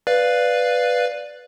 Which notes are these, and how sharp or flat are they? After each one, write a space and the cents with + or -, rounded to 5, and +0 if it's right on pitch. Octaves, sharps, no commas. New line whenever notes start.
B4 +0 D5 +0 F5 +0